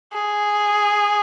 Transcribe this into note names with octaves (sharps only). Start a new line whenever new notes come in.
G#4